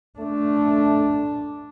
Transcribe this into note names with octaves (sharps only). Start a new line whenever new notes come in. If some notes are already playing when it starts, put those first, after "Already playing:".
A3 D4